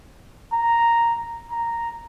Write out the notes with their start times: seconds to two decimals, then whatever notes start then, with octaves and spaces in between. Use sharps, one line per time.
0.52 A#5
1.51 A#5